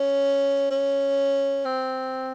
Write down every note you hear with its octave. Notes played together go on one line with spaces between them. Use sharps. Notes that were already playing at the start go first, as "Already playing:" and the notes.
Already playing: C#4
C#4
C4